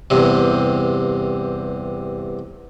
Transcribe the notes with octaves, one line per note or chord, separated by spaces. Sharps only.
E2 G2 C3